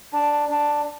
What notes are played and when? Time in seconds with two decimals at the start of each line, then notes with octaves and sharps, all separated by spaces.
0.13 D4
0.49 D4